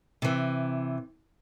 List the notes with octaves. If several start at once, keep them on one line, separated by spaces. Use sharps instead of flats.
C3 E3